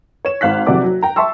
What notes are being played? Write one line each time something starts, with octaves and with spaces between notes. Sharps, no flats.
C#5 E7
G#1 F5 F#6 B6
F#1 F2 C3 F#4 D5 D6
F#3
G5 A#5
E5 A5 C6 C#6 E6